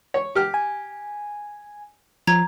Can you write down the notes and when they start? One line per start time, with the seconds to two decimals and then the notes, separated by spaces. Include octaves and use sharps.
0.14 C#5
0.35 G4 F6
0.54 G#5
2.27 F3 A#5 G#6